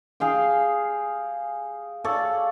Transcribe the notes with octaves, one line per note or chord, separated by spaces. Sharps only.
G#4 F5 G5
A4 C#5 D5 F5